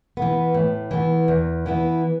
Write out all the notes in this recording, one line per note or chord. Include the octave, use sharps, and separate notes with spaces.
E3 B3
A2
E3 B3
E2
E3 B3 E4